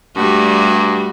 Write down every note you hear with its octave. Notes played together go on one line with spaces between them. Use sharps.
G2 G3 A3 F#4